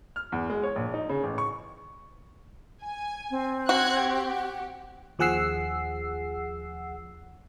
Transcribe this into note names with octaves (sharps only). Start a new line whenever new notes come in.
F6
E2
G#3
C#5
A#1
D#4
C#3
A1
C#6
G#5
C4
F#4 F#6 G#6
G4
F#5
D#2 F3 G#4 F#5 E6 C7